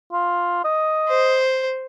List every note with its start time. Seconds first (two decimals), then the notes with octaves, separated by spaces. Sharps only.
0.13 F4
0.64 D#5
1.08 C5